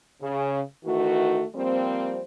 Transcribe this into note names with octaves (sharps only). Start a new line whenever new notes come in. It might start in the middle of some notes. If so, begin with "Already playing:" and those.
C#3
D#3 E3 A3 F#4
F3 G3 A#3 C4